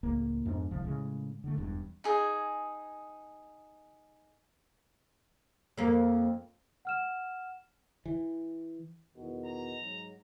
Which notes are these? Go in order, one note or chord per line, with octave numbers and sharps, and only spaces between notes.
C#2 A2 A#3
F2 G#2 B3 D4
D1 C2 C3 F3
A2 C#3 G#3
D3 A3
E1 E2 G2
D#4 G#4 G#5
F2 A#3
F#5 F6 E7
E3
E2 B2 D#3
A#5
G#2 F#3